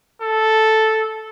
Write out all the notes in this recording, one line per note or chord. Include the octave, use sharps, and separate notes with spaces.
A4